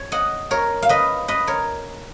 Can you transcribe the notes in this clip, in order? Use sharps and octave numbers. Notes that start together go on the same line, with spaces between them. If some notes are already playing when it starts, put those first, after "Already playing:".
Already playing: C#5
D#5 F#5
A#4 C#5
F5
B4 D#5
B4 D#5
A#4 C#5